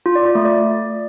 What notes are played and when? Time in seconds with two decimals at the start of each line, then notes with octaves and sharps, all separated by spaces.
0.06 F4
0.15 D5
0.25 F4
0.35 A3
0.45 D5